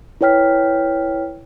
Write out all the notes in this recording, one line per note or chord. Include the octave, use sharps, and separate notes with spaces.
E4 B4 C#5 G5 F6 B6